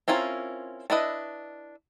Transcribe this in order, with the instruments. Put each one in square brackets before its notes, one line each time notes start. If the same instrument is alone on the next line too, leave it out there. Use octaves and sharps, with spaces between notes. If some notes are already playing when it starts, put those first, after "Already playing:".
[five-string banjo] C4 C#4 E4 F4 A#4
D4 E4 B4 D#5